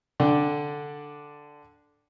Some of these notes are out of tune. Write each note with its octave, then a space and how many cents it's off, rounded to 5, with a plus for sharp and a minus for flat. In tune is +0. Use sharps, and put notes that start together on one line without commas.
D3 +0 D4 +0 G5 +15